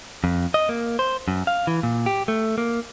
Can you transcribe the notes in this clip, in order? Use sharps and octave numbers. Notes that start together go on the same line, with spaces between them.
F2
D#5
A#3
C5
F#2
F5
E3
A#2
G4
A3
A#3